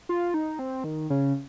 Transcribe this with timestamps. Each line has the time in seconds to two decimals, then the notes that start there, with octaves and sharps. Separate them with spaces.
0.09 F4
0.34 D#4
0.59 C4
0.84 D#3
1.10 C#3